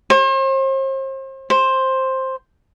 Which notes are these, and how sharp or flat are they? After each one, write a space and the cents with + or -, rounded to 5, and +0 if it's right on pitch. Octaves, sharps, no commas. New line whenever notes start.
C5 +40
C5 +10